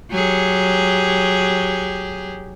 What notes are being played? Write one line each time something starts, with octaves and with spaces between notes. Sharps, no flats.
F#3 G4 G#4